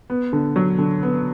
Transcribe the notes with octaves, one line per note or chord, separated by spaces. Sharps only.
B3
D3
F#3
D3
B3